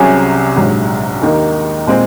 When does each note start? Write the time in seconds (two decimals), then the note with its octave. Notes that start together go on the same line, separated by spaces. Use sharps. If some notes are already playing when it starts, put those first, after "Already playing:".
Already playing: C2 C3 F#3 C#4 G#4
0.56 A#1 G#2 F#3
1.21 D#2 D#3 A#3 D#4
1.87 A#2 G#3 C4